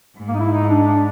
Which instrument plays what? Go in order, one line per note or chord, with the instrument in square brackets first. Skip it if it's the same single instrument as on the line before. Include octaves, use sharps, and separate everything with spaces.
[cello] G#2
[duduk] A#3
D#4
E4
D#4
D4
D4